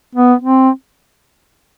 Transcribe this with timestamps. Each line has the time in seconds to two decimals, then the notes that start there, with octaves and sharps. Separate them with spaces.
0.15 B3
0.42 C4